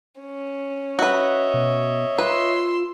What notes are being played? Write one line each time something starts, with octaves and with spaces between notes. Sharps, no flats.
C#4
F#4 B4 C#5 D#5 E5
B2
F4 B4 C6 E6